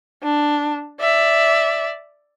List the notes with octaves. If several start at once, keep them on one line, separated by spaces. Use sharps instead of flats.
D4
D5 E5